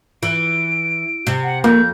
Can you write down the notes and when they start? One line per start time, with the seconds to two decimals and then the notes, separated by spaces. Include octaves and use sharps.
0.23 E3 D7
1.27 C3
1.43 F#5
1.64 F2 A#3 G6